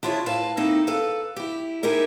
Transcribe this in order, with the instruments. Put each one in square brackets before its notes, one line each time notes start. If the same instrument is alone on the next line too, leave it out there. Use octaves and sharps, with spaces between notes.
[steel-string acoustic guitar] D4 E4 F4 G#4 C#5
A2 B4 F5 A5
A#3 C4 D#4 E4 A4
A4 B4 F5
E4 G4
D#4 E4 G4 G#4 A#4 D#5